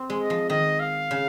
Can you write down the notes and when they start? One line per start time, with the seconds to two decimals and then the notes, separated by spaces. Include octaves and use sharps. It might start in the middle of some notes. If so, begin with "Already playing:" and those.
Already playing: C4
0.10 G#3
0.20 D#5
0.30 F3
0.50 D#3 D#5
0.80 F5
1.11 C#3